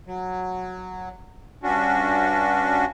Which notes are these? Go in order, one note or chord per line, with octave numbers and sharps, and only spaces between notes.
F#3
G2 C#4 D4 F#4